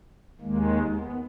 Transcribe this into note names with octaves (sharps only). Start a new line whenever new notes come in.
D#2 D#3 G#3 A#3
B3